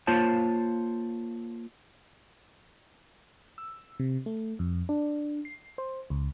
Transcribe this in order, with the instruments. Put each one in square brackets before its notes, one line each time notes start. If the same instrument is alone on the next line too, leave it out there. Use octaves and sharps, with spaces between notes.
[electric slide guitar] A#3 F4 C5 C#5 A5
[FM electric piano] E6
C3
A3
F2
D4
C7
C5
C#2